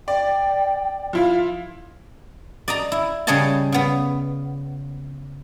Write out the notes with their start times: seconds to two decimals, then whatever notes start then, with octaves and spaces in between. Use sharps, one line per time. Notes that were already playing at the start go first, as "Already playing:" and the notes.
0.08 D5 G5
1.13 F3 E4 F4
2.68 D5 D#5 A#5
2.92 E4
3.27 C#3 G3 G#4 C#5 D#5 A5
3.72 C#3 B3